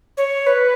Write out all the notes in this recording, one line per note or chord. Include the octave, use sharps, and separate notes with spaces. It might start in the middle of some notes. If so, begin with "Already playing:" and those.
C#5
B4